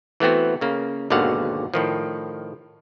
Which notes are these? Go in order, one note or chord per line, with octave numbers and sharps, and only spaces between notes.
E3 A3 B3 C4 F#4
C#3 A#3
G#1 D#2 B2 D3 F5 F#5
A2 D#3 F3